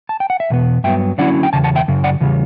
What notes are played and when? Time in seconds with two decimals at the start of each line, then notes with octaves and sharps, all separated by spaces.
0.09 A5
0.20 G5
0.30 F#5
0.40 E5
0.50 E2 B2 B3
0.84 G2 F#3 B3 E5 G5
1.18 D3 F#3 C#4 E4 D5 F#5
1.43 G5
1.53 E2 C#3 A5
1.64 F#5 A5
1.75 E5 G5
1.88 F#2 C#3
2.04 D5 F#5
2.20 E2 C#3 G3